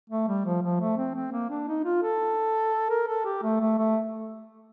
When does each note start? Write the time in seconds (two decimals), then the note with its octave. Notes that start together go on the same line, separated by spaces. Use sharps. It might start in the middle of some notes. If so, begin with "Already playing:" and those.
0.10 A3
0.28 G3
0.45 F3
0.62 F3
0.80 A3
0.97 C4
1.15 C4
1.32 A#3
1.50 D4
1.68 D#4
1.85 F4
2.03 A4
2.90 A#4
3.08 A4
3.25 G4
3.42 A3
3.60 A3
3.78 A3